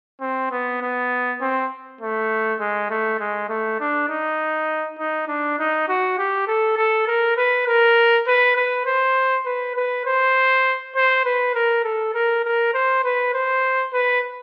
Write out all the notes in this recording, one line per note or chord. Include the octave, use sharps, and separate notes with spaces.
C4
B3
B3
C4
A3
G#3
A3
G#3
A3
D4
D#4
D#4
D4
D#4
F#4
G4
A4
A4
A#4
B4
A#4
B4
B4
C5
B4
B4
C5
C5
B4
A#4
A4
A#4
A#4
C5
B4
C5
B4